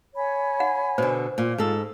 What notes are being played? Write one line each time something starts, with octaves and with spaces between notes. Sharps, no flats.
C#5 G#5 B5
F#5
B2 D3 C5
A#2 F4
G#2 A4